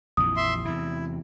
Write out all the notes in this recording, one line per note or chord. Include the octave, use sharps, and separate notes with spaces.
A#1 F2 E3 D#6
E5 C6
E2 C3 E4